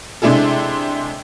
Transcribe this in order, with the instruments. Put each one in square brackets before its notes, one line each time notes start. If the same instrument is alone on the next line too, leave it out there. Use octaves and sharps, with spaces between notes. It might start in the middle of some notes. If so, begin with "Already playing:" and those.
[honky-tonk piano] C3 G#3 D4 E4 G#4 A4